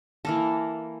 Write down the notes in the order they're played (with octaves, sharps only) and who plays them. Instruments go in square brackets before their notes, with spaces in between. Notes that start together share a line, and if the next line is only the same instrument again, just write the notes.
[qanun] E3 A#3 A4